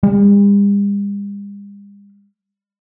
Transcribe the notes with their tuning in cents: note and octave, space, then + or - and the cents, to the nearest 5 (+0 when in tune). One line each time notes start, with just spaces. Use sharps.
G3 +45